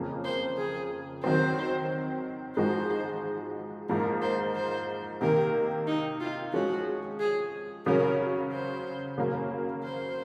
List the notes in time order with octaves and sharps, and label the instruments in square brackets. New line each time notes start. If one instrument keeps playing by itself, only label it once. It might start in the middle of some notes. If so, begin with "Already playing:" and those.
Already playing: [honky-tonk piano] F2 C#3 F3 A#3
[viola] C5
G#4
[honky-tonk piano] D#3 F#3 C4 [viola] C5
[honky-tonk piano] G#2 F3 G#3 D#4 F#4 [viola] C5
[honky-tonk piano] G#2 F3 A#3 [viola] A#4
[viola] C5
C5
[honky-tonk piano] C3 D#3 A#3 [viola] A#4
[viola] D#4
F4
[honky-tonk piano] F3 G#3 C#4 [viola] F#4
[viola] G#4
[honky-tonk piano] C#3 F#3 C#4 [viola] A#4
[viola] C5
[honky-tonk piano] C#3 F#3 A#3
[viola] C5